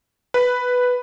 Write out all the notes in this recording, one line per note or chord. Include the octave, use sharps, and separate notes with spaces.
B4